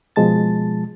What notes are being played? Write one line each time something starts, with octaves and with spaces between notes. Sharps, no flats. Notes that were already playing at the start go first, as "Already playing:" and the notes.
B2 F3 G#3 A5 A6